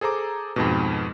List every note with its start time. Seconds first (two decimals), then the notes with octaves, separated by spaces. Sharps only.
0.01 G#4 A4 C5 A#5 D6
0.56 F2 G#2 B2